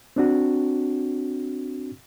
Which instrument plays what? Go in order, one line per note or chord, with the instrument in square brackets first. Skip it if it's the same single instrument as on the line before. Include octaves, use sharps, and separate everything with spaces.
[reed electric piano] C4 D4 F#4